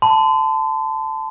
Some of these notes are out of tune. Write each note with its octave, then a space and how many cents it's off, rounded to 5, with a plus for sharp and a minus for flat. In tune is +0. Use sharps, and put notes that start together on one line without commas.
A5 +0 C6 -40